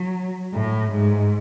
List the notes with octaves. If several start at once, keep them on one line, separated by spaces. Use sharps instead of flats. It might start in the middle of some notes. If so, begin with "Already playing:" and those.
Already playing: F#3
A2
G#2